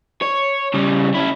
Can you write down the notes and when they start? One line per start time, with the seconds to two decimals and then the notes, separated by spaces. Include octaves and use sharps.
0.22 C#5
0.74 C#3 G3
1.15 C#4 E4